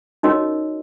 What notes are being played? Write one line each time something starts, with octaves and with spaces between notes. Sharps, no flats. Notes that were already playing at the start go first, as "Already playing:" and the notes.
C#4 D#4 F#4 A#4 C#5 D#5